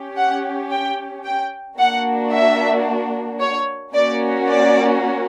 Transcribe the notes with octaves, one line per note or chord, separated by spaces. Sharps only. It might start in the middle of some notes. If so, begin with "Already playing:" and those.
Already playing: C#4 G4
F#5
G5
G5
A#3 D4 F#4 F#5
E5
C#5
A#3 C#4 F#4 D5
D5